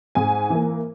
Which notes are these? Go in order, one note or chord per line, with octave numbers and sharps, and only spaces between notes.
G#2 G#5
E3 A#3